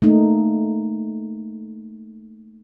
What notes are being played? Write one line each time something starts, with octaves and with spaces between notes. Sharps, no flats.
A3 A#3 D#4